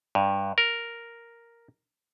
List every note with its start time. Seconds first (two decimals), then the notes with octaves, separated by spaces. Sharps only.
0.15 G2
0.58 A#4